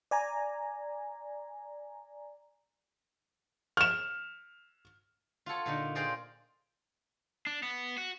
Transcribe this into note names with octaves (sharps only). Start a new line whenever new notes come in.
D5 G#5 A#5
F6 E7
F4 F#4 A4 C#5
A#2 D3 D#4
F4 G#4 C5 D5 D#5 G5
D4
B3
F#4